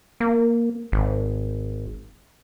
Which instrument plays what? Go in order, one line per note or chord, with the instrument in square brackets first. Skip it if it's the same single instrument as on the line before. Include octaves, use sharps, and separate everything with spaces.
[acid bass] A#3
G#1